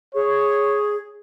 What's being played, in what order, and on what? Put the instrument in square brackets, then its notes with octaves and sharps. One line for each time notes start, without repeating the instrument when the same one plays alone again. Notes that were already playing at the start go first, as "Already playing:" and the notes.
[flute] G#4 [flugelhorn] C#5